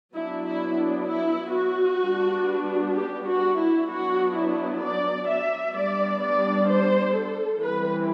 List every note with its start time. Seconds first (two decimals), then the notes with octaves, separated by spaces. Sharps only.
0.14 F#3 B3 D4 E4
0.45 E4
0.77 D4
1.07 E4
1.54 F#4
2.01 G3 B3 D4
2.94 G4
3.25 F#4
3.56 E4
3.87 F#3 B3 D4 F#4
4.34 E4
4.80 D5
5.27 E5
5.73 G3 B3 D4 D5
6.20 D5
6.67 C5
7.13 A4
7.60 E3 G3 C4 B4